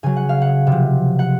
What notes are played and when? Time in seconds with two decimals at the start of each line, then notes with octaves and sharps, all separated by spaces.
0.03 C#3 F#3 G#5
0.16 F#5
0.29 F5
0.41 F#5
0.67 C3
0.72 F3
1.19 F#5